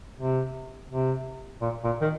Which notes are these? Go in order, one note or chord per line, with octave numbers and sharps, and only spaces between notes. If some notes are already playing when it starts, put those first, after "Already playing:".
C3
C3
A#2
A#2
D#3